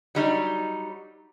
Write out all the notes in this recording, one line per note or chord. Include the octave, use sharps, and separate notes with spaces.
F#3 G3 D#4